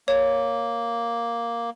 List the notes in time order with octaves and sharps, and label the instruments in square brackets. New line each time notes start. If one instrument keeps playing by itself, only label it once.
[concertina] A#3 [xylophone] C#5